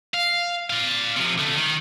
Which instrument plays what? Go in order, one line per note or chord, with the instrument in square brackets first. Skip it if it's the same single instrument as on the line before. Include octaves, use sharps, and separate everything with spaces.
[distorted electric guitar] F5
D5 F5
C3 F3
D3 A3
D#3